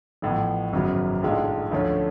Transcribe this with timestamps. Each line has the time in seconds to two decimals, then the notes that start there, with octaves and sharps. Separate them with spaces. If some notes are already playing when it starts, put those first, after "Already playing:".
0.22 A1 A2 F3 B3
0.73 G#1 F#2 C#3 F#3 B3
1.22 B1 A2 G#3 D4 F4
1.72 D2 D3 F3 A3 C#4